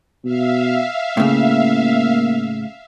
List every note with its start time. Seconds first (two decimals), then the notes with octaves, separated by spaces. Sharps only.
0.24 B2 E5 F5
1.17 A2 C#3 A#3